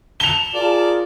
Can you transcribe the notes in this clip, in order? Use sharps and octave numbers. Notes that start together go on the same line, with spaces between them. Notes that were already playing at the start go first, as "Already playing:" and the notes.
A5 F7 G7
F4 G#4 A#4 D5